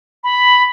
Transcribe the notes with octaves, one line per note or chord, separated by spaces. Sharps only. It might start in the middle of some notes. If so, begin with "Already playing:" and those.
B5